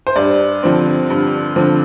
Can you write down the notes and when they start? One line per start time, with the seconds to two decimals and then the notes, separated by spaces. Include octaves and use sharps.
0.07 C5
0.16 G2 D5
0.63 D3 F3 C4
1.10 G2
1.56 D3 F3 C4